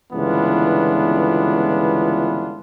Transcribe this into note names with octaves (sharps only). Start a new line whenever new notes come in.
G1 C#2 E3 B3 D4 F4